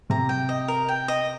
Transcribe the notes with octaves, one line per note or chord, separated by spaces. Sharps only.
C3 A#5
G5
D#5
A#4
G5
D#5